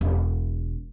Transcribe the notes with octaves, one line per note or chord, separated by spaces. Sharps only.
E1